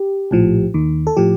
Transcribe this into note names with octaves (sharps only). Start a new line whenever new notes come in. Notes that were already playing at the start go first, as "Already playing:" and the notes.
Already playing: G4
A#1 A2 F3
D#2 D#3
A4
A2 F3 G4